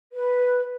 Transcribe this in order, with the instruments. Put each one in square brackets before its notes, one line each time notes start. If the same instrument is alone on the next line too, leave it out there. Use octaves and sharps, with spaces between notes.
[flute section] B4